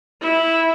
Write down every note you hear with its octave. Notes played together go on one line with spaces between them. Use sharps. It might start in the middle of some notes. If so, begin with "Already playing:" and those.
E4